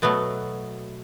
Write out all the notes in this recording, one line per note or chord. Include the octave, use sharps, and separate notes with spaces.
B2 F#3 A3 B3